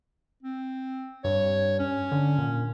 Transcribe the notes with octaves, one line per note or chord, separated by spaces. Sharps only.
C4
G2 C#5
C#4
D3
A#2